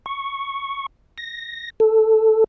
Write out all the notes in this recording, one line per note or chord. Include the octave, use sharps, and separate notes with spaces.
C#6
A#6
A4